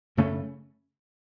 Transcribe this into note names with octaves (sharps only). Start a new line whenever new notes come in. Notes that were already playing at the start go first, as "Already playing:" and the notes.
F#2 C#3 A3 C#4